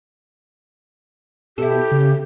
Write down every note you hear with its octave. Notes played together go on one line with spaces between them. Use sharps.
B2 E4 G4 A4
C#3